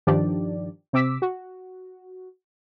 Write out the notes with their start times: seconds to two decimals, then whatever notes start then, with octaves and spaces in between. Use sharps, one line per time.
0.07 G2 D#3 F3 D4 G4 D5
0.93 C3 C4 D6 E6 B6
1.22 F#4